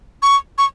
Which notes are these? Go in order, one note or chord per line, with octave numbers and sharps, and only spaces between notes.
C#6
C#6